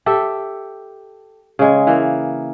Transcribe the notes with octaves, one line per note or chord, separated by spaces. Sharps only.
G4 A4 E5
C#3 G#3
E3 A#3